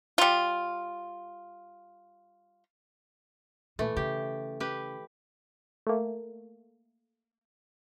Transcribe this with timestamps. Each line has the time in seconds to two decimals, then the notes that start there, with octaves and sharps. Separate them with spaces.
0.18 G3 F4
3.79 A#2 E3 A3
3.97 C#3 G4
4.60 G4 B4
5.87 A3 A#3